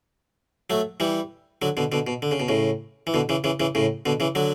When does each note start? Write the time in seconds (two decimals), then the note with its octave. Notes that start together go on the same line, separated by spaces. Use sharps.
0.70 F#3 A3
1.00 E3 G3
1.62 D3 F#3
1.77 B2 D3
1.92 B2 D3
2.07 B2
2.22 D3
2.31 C#3
2.40 B2
2.48 A2 C#3
3.07 E3
3.14 B2 D3
3.29 C#3 E3
3.44 C#3 E3
3.60 C#3 E3
3.75 A2 C#3
4.06 B2 D3
4.20 C#3 E3
4.35 D3 F#3